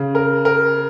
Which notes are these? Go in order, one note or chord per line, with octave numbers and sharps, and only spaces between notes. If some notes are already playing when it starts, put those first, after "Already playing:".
Already playing: C#3
A#4
A#4